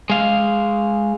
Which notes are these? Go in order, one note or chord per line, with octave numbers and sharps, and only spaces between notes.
G#3 F5